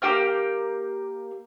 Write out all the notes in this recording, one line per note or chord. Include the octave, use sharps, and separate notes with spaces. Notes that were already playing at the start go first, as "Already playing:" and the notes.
A#3 G4 G5 F6